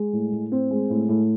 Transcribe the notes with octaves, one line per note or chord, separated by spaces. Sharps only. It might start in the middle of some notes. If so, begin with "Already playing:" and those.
Already playing: G#3
A2
A2
C4
G#3
A2
A2